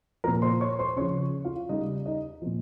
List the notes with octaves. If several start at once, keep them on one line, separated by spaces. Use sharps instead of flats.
A#2 F3 A#4 A#5
C5 C6
C#5 C#6
C5 C6
C#3 F3 C#5 C#6
F4 F5
C#3 G3 D#4 D#5
D#4 D#5
A#2 F3